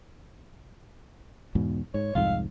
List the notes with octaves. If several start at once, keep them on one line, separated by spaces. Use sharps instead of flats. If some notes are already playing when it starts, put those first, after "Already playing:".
E2 G#2 B2
G#2 C#5
C2 F2 G#2 F5